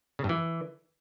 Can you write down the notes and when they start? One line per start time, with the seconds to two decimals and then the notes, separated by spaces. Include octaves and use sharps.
0.19 C#3
0.24 G2
0.29 E3